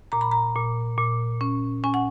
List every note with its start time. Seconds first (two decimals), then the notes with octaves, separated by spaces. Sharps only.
0.12 A#2 A#5
0.21 B5
0.31 A#5
0.56 A#2
0.98 A#2
1.41 C#4
1.84 C#4 G#5
1.94 F#5